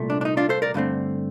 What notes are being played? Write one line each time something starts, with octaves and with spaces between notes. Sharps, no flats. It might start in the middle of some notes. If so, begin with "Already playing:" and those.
Already playing: C2 A#2 A3
D4
D4
D#4
D4 F4
A4 C5
A#4 D5
G2 D3 A3 C4